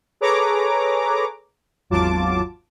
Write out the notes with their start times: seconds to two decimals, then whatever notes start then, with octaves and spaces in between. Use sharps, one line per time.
0.21 G#4 A4 B4 C#5 A#5 D6
1.90 G#1 E2 F#3 F4 A5 D6